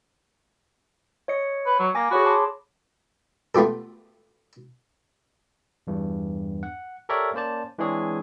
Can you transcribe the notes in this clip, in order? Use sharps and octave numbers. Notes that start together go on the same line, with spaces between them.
C#5 D#5 C#7
B4
F#3
A#3 G#5 D6 A#6
F#4 G#4 C#5 B5
A5 C6 D6
A3 B3 F4 G4 A4
E2 G2
F#5
G4 A4 A#4 C#5 D5 E5
A#3 C#4 C5 D5 A5
E3 G#3 C4 D4 G#4 C#5